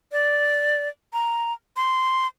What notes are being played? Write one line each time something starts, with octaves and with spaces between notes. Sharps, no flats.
D5
A#5
C6